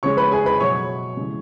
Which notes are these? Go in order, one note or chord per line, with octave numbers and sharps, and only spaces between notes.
C#3 G#3 C#5 C#6
B4 B5
G#4 G#5
B4 B5
B2 F#3 C#5 C#6
C#3 E3 G#3